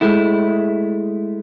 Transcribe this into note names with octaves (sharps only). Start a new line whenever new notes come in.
G#3 A3 E4